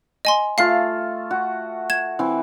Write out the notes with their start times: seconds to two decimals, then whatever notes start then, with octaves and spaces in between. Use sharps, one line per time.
0.25 D#5 G#5 C6
0.58 A3 F4 F5 C7
1.31 F#4
1.90 G#6 E7
2.19 E3 C4